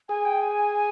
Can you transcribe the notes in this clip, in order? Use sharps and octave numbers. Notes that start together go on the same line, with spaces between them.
G#4 G#5
G5
G#5